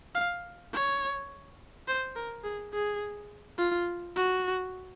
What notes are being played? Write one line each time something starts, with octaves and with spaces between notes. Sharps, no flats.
F5
C#5
C5
A#4
G#4
G#4
F4
F#4